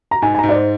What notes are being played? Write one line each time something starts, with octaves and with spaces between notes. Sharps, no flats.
A#5
G#2 G#5
G#5
G#2 A#5
D5
C5